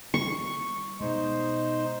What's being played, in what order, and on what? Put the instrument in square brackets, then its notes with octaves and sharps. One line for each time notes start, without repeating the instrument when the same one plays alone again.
[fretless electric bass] G3 [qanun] C#6
[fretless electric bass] B2 G#3 [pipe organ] D#4 C5